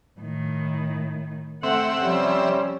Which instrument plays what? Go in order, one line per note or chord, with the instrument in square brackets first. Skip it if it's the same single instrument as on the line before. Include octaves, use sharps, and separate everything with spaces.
[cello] A2 D#3
[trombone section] A3 [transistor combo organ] C4 E5 [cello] F#5
[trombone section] C3 G3 C#4 [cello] F3